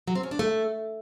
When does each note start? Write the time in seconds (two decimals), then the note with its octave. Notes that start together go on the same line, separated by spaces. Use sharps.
0.07 F#3
0.15 C4
0.23 C#4
0.31 D4
0.39 A3